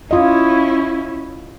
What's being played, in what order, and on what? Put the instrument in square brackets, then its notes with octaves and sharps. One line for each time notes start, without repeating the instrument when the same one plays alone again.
[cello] C#4 E4 [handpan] F4 D#5